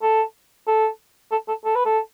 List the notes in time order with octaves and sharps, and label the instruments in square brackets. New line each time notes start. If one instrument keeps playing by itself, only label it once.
[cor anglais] A4
A4
A4
A4
A4
B4
A4